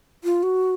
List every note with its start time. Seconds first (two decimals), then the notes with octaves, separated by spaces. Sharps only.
0.24 F4
0.43 F#4